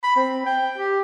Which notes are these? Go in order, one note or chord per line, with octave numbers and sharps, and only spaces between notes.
B5
C4
G5
G4